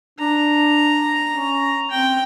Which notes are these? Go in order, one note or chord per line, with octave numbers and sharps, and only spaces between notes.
D4 A#5
C#4
C4 G5